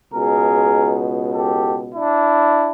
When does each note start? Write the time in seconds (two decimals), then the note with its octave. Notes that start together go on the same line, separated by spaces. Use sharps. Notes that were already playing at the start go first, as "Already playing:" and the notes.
0.13 C#2 B2 G#4 A#4
1.34 G4 A4
1.94 D4 E4